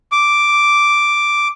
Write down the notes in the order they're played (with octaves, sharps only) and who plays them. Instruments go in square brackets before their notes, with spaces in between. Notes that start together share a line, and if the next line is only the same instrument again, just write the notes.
[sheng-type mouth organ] D6